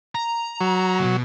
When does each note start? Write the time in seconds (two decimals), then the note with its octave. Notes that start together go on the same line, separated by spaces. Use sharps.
0.15 A#5
0.61 F#3
1.00 D2 B2